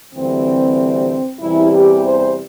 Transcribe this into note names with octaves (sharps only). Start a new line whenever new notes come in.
D2 C3 E3 G3 C4
E2 C3 E3 G3 E4
G4
C5